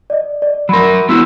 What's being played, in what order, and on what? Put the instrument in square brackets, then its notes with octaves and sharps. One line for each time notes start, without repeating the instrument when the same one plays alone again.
[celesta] D5 D#5
D5
[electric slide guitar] F#3 A#4 [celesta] B5 C6
[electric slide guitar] B3 E4 F#4 [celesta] C6 E6